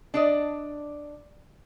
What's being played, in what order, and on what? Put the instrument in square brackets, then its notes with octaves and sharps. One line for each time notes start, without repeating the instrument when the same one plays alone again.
[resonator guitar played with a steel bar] D4 D5 D#5